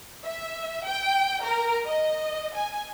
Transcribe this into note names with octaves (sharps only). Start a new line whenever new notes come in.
E5
G5
A#4
D#5
G#5